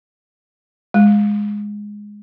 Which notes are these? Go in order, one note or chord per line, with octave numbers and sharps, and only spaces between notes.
G#3